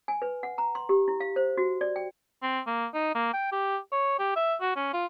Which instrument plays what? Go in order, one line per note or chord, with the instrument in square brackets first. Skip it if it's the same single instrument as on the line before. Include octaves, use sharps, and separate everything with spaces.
[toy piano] G#5
B4
F#5
A#5
C6
G4
E4
F5
C5
F#4
D5
G5
[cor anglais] C4
A#3
D#4
A#3
G5
G4
C#5
G4
E5
F#4
C#4
F4